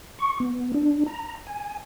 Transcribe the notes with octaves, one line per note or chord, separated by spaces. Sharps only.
C#6
B3
D4
A#5
G#5